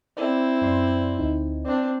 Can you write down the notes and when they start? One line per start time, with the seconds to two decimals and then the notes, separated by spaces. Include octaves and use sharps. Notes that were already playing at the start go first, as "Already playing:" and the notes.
0.17 C4 E4 D5
0.61 F#2 D5 C6
1.19 D2 D#4
1.65 C4 D4 D5